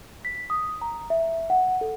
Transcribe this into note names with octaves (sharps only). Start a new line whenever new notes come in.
B6
D#6
A#5
E5
F#5
A4